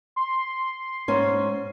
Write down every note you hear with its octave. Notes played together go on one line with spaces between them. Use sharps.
C6
G#2 C#4